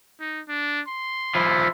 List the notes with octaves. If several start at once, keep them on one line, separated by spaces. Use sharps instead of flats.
D#4
D4
C6
F3 E4